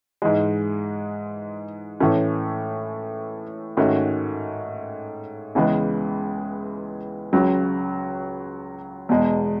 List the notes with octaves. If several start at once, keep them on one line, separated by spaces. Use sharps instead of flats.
G#2 E3 G#3
A2 E3 A3 C#4
G#2 D#3 A3 C#4 F#4
C#2 C#3 E3 G#3 B3
C#2 C#3 F#3 C#4
E2 B2 G#3